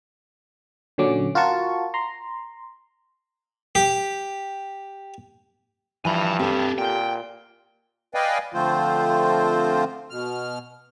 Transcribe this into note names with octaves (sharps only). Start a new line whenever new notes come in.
A#2 D3 F#3 C#4 D6
F4 F#4 A#4 A5 C#6
A#5 C6
G4
G2 E3 F3 G#5 B5
C4 D4 G4 A4 A5
A#2 G5
B4 D5 D#5 F5 G5 G#5
D3 F3 A3 C4 F4 C5
B2 F6